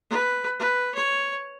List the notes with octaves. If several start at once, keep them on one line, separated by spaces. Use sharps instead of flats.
B4
B4
C#5